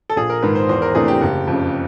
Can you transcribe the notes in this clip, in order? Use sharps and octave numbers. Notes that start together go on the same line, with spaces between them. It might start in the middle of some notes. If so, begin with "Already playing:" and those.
A4
A#1 G#4
A#4
G#2 D#3 B4
C5
E2 C5
A#4
C3 E3 A3 D4 G#4
G4
F#1
F2 C#3